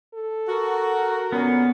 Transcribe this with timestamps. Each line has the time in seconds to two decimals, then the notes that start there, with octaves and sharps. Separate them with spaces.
0.14 A4
0.48 F#4 A#4
1.32 A#2 D3 B3 C#4